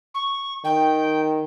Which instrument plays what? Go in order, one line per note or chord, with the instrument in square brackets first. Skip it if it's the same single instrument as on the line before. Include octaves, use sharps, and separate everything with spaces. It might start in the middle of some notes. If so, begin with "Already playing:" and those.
[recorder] C#6
[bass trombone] D#3 [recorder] G5